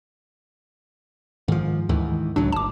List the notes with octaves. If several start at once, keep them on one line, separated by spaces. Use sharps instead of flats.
G#2 D#3 F3
D2 G#2 D#3 E3
C#2 A2 F#3 D4
G1 A5 D6